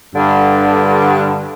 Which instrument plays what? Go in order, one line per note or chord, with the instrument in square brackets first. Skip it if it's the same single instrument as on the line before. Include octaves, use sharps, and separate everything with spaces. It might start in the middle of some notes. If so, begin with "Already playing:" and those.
[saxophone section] G2 D3